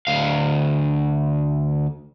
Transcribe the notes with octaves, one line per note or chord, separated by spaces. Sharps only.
D2 F5